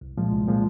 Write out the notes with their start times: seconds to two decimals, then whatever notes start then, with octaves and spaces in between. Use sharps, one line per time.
0.01 C2
0.17 A#2 F3 G#3
0.32 C2
0.48 A#2 F3 G#3